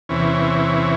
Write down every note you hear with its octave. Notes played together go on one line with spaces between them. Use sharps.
E2 C3 E3 C#4